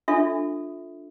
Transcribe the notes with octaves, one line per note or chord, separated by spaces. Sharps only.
D4 F4 A4 E5